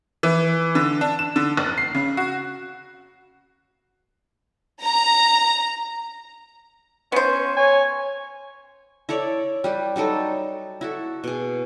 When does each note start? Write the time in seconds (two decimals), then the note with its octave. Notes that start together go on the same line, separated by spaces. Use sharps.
0.23 E3
0.75 D3
1.01 D4
1.19 E7
1.36 D3
1.57 F#1
1.78 C7
1.94 C#3
2.17 F#4
4.82 A#5
7.12 B3 C#4 C5
7.56 C#5 G#5
9.09 E4 A4 C#5 D5
9.64 G3 G4 B4
9.96 F#3 G3 D#4 A4
10.81 E4 F#4 A4
11.24 B2 G#4